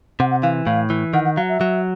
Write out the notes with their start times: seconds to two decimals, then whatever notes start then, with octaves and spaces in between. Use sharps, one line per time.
0.20 C3 F#5
0.31 F#5
0.42 E3 F5
0.66 A2 F5
0.90 E3
1.13 D#3 F#5
1.25 F#5
1.36 F#3 F5
1.49 E5
1.61 F#3